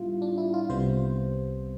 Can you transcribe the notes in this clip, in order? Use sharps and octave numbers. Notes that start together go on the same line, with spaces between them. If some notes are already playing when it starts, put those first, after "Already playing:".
Already playing: A2 G3 B3 D4 E4 F4
D4
E4
F4
C2 C3 G3 B3 C5